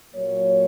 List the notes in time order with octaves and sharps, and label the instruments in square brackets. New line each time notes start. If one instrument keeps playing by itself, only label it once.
[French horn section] A#2 F#3 A#3 C#5